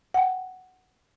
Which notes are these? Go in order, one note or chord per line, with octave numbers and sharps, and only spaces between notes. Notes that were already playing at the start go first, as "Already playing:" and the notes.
F#5 G5